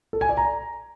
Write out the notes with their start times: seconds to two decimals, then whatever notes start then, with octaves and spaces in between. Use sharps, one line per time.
0.13 A4
0.21 G#5
0.29 D5
0.37 A#5